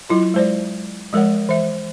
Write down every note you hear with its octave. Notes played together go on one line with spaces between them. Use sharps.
F#3 E4 F4
G#3 C5 D5
F3 G#3 A#4 C#5 F#5
E3 E5